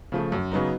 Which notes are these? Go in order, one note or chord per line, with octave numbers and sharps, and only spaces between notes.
C#3 F3 A3
F#2
C#3 F#3 B3 D#4